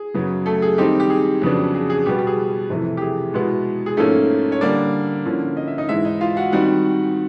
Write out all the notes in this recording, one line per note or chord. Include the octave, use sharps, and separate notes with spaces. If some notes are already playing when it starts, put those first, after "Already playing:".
Already playing: G#4
F#2 C#3 F#3 B3
A3 A4
G#4
D#3 G3 C4 D#4 G4
G4
G#4
F2 C#3 F#3 B3 D4
G#4
G#4
B2 G3 B3 G4
G4
G#4
F2 C3 E3 A3
G4
G#4
B2 G#3 B3 E4
G#4
G#2 F3 A3 A#3 C#4 A4
C#5
D3 G3 A#3 D4 D5
D3 F3 A#3 C#4 E4
D#5
E5
D#4 D#5
G#2 E3 G#3 E4 E5
D#4 D#5
F4 F5
F#4 F#5
D#3 G3 C4 D#4 F#4 F#5